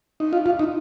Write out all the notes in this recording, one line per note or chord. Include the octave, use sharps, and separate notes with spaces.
D#4
F4
F4
D#4